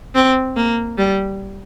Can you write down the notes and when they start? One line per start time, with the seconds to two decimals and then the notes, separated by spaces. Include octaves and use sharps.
0.15 C4
0.56 A#3
0.98 G3